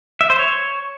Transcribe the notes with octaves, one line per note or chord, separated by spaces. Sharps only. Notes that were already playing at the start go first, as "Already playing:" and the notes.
E5
C5
C#5